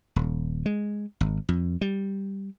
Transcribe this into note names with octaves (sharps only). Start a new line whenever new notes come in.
D#1
G#3
G#1
F2
G3